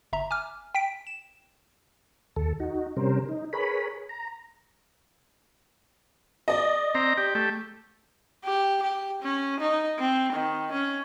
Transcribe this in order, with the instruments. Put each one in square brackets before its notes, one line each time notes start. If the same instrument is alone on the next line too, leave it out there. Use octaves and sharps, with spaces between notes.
[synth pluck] G1 E5 A#5
G#5 D6 F6
G5 B6 D7
E7
[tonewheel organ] D#2 A4
D#4 F#4
C3 G3 C#4 A#4 C5
D#4
G#4 A#4 B4 C#5 B5
A#5
[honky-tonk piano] D5 D#5
[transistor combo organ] C4 A#5
G4
A3 G4
[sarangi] G4
G4
C#4
D#4
C4
D#3
C#4